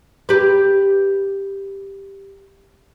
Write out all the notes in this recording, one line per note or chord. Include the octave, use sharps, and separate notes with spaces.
G4 B4